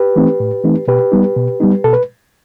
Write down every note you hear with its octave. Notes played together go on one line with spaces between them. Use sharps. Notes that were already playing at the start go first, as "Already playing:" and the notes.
Already playing: G4 B4
E3 A3 C4 D#4
A2
E3 A3 C4 D#4
B2 G4 B4
G3 B3 D#4
B2
G3 B3 D#4
B2 A4
B4